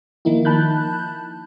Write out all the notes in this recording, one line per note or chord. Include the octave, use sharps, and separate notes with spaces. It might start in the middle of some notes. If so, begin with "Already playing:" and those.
D#3 F3 A#3 D#4 E4
A5 B5 F#6 G6